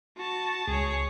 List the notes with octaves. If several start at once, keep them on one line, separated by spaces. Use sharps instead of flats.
F#4 A5
C#2 G#4 C#5